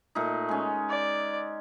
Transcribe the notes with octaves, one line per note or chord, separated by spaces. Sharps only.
A#2 A3 D#4
G#3 C#4
D5